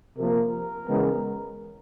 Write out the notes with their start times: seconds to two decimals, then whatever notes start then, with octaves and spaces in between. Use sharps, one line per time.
0.17 C3 F3 A#3 A#4
0.86 C#3 E3 G#3 B3